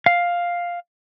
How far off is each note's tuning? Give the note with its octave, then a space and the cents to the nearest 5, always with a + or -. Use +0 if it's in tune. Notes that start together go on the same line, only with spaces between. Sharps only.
F5 +5